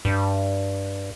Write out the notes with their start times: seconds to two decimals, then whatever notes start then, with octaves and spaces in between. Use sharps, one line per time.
0.05 G2